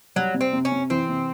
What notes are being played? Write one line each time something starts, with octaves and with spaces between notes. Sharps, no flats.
F#3 G3
C3
C4
C3
C#4
C3
E3 C4
C3